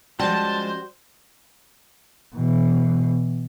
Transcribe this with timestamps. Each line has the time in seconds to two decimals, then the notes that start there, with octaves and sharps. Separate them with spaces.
0.19 F3 G3 G#3 C#4 F#4 C5 G5 A5
2.35 B2 E3